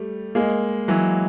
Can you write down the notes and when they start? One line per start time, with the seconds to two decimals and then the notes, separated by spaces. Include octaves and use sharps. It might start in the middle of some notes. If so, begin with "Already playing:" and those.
Already playing: G3 A3
0.35 G#3 A#3
0.88 E3 F#3